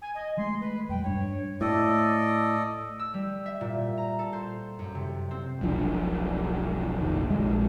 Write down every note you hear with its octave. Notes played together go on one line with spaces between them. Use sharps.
G#5
D#5
E3 G#3 A3 C6
B4
F2 A#2 F#3 G5
G2 G3 D4 C#5
A2 A4 D5 D#5
E6
G3
E5
A#2
A#5
A4
C5
F#2
C3
C4
E1 B1 F3 D4
F1 A#1 D#2 D#3
A#1 G#3